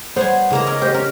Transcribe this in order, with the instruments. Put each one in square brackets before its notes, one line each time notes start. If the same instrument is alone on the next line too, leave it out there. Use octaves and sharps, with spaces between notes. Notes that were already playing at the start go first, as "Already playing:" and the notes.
[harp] G3 C#5 G6 [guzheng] B3 F#5 G#5 [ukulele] C5
[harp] C#3 E4 E6 [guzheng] G#3 A#3 A#5
[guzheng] C#4 A#4 D#5
[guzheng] G4 [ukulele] C5 D#5
[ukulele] C#4 [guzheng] A#4